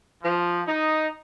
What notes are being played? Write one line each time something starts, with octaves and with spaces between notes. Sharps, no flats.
F3
D#4